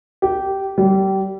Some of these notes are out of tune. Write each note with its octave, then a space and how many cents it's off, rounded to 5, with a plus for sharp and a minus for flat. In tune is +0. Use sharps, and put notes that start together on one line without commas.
G4 -15
G3 -30